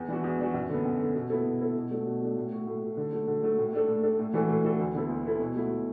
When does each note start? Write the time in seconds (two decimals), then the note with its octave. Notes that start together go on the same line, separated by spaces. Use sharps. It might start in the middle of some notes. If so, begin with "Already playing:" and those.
Already playing: E2
0.08 E3 D4 F#4
0.24 E2
0.39 E3 D4 F#4
0.54 F#2
0.70 D3 B3
0.85 F#2
1.00 D3 B3
1.15 B2
1.30 B3 E4 A4
1.45 B2
1.61 B3 E4 A4
1.76 B2
1.91 F#3 A3 D4
2.06 B2
2.22 F#3 A3 D4
2.36 A2
2.51 A3 F#4
2.67 A2
2.82 A3 F#4
2.97 D3
3.12 F#3 A3
3.27 D3
3.43 F#3 A3
3.58 A2
3.73 A3 D4 A4
3.88 A2
4.03 A3 D4 A4
4.19 A2
4.34 E3 D4 F#4 A4
4.50 A2
4.64 E3 D4 F#4 A4
4.79 D2
4.95 D3 B3 E4 A4
5.09 D2
5.25 D3 B3 E4 A4
5.40 B2
5.56 F#3 A3 E4
5.70 B2